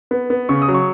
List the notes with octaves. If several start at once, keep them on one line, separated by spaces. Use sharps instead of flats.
B3
B3
C#3 C#6
D#6
F#3
C#6